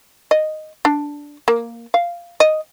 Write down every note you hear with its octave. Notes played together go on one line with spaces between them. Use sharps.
D#5
D4
A#3
F5
D#5